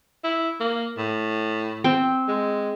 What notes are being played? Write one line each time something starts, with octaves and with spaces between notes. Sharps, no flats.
E4
A#3
A2
C4
G#3